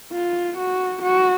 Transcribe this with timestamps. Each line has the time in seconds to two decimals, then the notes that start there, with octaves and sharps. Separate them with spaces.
0.12 F4
0.58 F#4
1.03 F#4